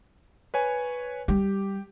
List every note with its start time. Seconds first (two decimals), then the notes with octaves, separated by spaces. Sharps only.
0.54 B4 C#5 G#5
1.28 G3 G4